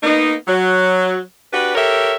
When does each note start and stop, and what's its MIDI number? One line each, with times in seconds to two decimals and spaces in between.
0.03 0.33 58
0.03 0.33 59
0.03 0.33 63
0.48 1.19 54
1.53 1.75 62
1.53 1.75 66
1.53 1.75 67
1.53 1.75 71
1.75 2.15 67
1.75 2.15 69
1.75 2.15 70
1.75 2.15 73
1.75 2.15 76